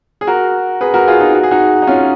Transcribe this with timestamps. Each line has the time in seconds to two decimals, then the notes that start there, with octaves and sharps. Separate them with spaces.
0.21 G#4
0.27 F#4 A#4
0.81 G#4 B4
0.94 F#4 A#4
1.07 F4 G#4
1.20 D#4 F#4
1.35 F#4
1.43 G#4
1.51 D#4 F#4
1.82 D#4
1.87 C#4 F4